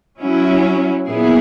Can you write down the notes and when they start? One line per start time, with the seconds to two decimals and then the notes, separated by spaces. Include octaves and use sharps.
0.20 F#3 C#4 E4
1.06 A#2 F#3 B3 E4 G#4